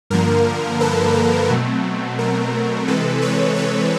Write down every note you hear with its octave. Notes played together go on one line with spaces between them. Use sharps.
G2 D3 F3 A#3 A#4
A4 B4
A4
B2 F#3 A3 C4
A#4
C3 E3 G#3 C4 A4 B4
B4 C#5
B4 C#5